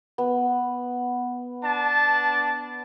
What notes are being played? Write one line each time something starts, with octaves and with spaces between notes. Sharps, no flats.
B3
D4 A5